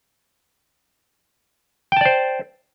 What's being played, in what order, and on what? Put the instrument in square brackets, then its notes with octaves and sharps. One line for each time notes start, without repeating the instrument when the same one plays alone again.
[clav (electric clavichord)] G5
A5
D5
C5